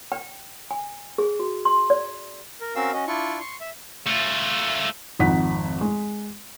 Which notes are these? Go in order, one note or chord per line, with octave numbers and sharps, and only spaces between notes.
G5
G#5
G#4
F#4
C6
D5
A#4
C4 C#4 F#4 A#4 F5 E6
C#4 F#4 D#5
D4 E4 F4 D5 C#6
C6 C#6
E5
A3 F4
G#1 F2 D#4 F#5 B6
G#3